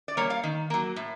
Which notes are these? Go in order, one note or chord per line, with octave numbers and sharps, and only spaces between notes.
D5
G3 A#3 C#5
F5
D#3
F#3 A#3
A2